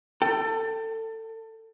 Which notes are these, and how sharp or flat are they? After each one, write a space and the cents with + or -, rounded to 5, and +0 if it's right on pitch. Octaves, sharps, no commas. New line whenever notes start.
A4 +25 G5 +0